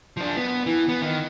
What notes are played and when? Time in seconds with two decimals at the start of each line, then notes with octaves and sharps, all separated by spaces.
0.17 F3 D4
0.37 B3
0.66 E3
0.89 B3
1.02 D#3